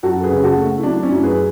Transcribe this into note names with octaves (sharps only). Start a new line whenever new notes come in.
F#2 F#4 A4
G#4 B4
C#3
F#4 A4
A3
E4
F#3 D4
C#4 E4
F#2
G#4 B4